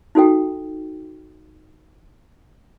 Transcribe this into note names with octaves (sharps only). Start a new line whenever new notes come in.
D#4 F#4 A4 G5